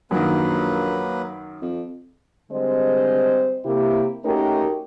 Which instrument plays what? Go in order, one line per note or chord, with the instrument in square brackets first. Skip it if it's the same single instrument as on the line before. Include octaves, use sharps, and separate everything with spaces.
[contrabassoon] A#1 [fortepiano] F#2 D#3 [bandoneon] F#3 A#3 B4
[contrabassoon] F2
[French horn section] D3 G3 G#3 C4 C5 D#5
C3 A#3 E4 G4
A3 C#4 D#4 F#4 G4 A#4